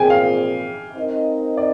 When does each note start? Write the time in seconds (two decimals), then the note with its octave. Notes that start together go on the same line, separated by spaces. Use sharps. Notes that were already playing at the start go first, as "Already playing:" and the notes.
Already playing: A#2 F3 C4 F4 G#4 G5 G#5
0.10 F5
0.96 C4 D#4 A#4 D#5
1.57 D5